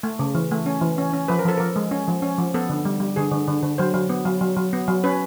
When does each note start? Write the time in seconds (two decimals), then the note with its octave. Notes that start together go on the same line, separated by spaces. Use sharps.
0.03 A3
0.19 C#3
0.35 E3
0.51 A3
0.66 C#4
0.81 E3
0.98 C#4
1.13 C#4
1.28 F3 B4
1.39 A#4
1.45 F3 A4
1.58 F3 A#4
1.76 G#3
1.91 C#4
2.08 F3
2.22 C#4
2.38 F3
2.54 B3 A4
2.70 D3
2.85 G3
3.00 G3
3.16 D3 G#4
3.31 D3
3.48 D3
3.63 D3
3.78 F#3 C5
3.94 F#3
4.09 B3
4.25 F#3
4.41 F#3
4.57 F#3
4.73 B3
4.88 F#3
5.04 C#4 B4